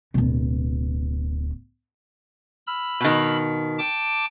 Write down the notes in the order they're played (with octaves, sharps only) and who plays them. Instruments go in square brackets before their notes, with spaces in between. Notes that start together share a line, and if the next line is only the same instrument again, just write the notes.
[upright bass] D1 B2
[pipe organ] B5 E6 F6
[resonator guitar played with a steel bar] B2 D#3
[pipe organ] G5 A5 D6